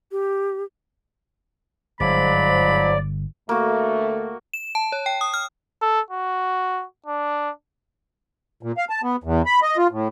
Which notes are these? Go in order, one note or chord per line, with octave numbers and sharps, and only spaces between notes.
G4
G1 G#2 F3 F#3 D5 B5
D2 A3 A#3 F#4
E7
A5
C#5
G5
D#6
F6
A4
F#4
D4
A#2
F5
A5
B3
E2
B5
D#5
F4
A2